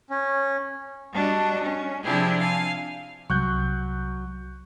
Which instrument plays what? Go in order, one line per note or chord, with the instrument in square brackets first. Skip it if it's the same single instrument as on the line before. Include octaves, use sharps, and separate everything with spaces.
[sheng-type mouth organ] C#4
[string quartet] G3 D4 F#4 D#5
C#4
C3 F3 D4 E4 G4 G#4
F5 G#5
[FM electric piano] C2 [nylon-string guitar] F#3 [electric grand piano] C#6 F#6 G6